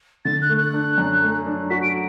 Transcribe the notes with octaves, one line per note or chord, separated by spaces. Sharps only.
D3 A6
F#6
A3
F#6
D4
F#2
A3
D4
F#4 B6
D7